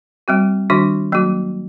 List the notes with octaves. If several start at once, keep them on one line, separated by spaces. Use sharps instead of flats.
G3 C4 F#4
D#3 G3 D4 F#4
F#3 A#3 F#4